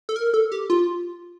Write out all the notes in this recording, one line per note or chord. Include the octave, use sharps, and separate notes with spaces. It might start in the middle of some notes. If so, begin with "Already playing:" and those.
A4
A#4
A4
G4
F4